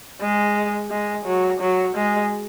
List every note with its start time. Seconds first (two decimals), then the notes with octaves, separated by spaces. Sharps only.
0.21 G#3
0.90 G#3
1.26 F#3
1.61 F#3
1.95 G#3